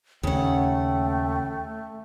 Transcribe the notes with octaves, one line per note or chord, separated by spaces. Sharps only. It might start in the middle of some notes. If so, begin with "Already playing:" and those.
D#2 C#3 A3 C#4 F#5 G5